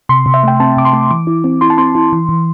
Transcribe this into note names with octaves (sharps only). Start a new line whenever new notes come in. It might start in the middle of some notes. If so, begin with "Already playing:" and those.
C3 C6
C3
E5
A3 G5
C4 A5
C3 D6
C6
A3
E3 D6
E4
C4
E4 C6
A5
C4 C6
E4
E3
E3